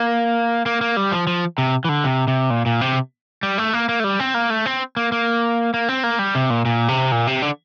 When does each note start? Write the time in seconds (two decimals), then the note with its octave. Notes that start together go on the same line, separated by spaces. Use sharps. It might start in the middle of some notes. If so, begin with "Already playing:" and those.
Already playing: A#3
0.66 A#3
0.81 A#3
0.97 G3
1.12 F3
1.27 F3
1.58 C3
1.85 E3
1.89 D3
2.04 C3
2.28 C3
2.50 A#2
2.66 A#2
2.81 C3
3.43 G3
3.58 A3
3.73 A#3
3.89 A#3
4.00 A3
4.04 G3
4.20 C4
4.34 A#3
4.50 A3
4.66 C4
4.97 A#3
5.12 A#3
5.74 A#3
5.89 C4
6.04 A#3
6.19 G3
6.35 C3
6.50 A#2
6.65 A#2
6.88 C3
7.12 A#2
7.27 C3
7.42 D3